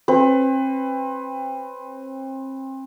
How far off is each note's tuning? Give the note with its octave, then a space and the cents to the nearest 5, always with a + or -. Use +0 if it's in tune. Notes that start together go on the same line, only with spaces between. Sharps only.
C4 +35 B4 +25